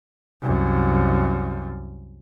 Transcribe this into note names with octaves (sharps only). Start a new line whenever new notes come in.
C2 F#2